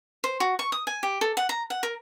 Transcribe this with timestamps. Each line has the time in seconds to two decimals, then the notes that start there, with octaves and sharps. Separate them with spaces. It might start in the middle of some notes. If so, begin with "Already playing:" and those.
0.24 C5
0.40 F#4
0.59 C#6
0.72 D#6
0.87 G#5
1.03 G4
1.21 A4
1.37 F#5
1.49 A#5
1.70 F#5
1.83 A#4